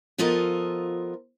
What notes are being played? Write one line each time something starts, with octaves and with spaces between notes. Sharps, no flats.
F3 B3 F4 A4 A#4 D#5